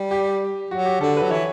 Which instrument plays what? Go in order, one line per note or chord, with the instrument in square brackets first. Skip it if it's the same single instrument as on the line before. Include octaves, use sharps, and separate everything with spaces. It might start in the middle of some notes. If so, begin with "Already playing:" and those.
Already playing: [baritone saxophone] G3
[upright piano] G4
[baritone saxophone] F#3 [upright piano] F#4
[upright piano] G4
[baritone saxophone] D3 [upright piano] A4
[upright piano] B4
[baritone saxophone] F#3
[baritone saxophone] E3 [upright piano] C#5